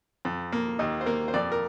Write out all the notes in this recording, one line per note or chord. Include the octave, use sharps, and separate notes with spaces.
F2
A#3
D#2 D#5
C5
A#3 A#4
C5
F2 D5
A#4